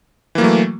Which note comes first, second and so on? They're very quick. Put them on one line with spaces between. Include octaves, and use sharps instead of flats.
E3 A#3 F#3 A3